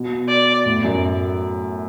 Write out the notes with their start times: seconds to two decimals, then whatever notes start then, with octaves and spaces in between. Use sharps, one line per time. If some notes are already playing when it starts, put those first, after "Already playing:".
Already playing: B2
0.29 D5
0.66 A2
0.84 F#2